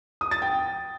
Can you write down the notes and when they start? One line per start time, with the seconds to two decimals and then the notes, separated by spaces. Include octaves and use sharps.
0.21 D#6
0.31 A6
0.42 G5